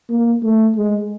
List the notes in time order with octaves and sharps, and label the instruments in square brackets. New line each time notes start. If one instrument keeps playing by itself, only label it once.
[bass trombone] A#3
A3
G#3